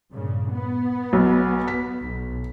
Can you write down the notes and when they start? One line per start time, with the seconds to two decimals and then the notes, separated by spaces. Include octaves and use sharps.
0.12 G2 A#2 C#3
0.53 B3
1.13 B1
1.68 B6
2.02 B1